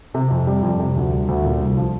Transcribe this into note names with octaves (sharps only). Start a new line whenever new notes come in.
C3
F2
G3
F2
C3
D2
G3
D2
A#2
C2
F3